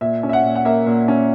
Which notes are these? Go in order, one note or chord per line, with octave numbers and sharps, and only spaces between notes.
A#2 E5
C#4
E5
F#5
A#2
F#5
A#3 E5
A#2
C#4